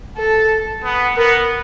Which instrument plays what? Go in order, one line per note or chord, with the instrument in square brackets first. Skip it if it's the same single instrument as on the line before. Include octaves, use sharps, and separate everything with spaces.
[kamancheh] A4
[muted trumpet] B3
[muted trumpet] B3 [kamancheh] A#4